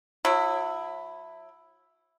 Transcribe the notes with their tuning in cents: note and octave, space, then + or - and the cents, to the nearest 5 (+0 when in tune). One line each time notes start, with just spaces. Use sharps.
F#3 -40 E4 +0